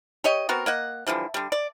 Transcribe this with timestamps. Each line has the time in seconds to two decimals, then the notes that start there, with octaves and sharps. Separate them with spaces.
0.24 G4 C#5 D#5
0.49 B3 C4 F#4 A#4
0.66 A#3 D#5 F#5
1.07 D3 E3 F3 G3
1.34 D3 G3
1.52 D5